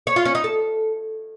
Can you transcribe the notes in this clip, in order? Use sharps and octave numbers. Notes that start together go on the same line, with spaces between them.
C#5
F4
C#4
D#4
A4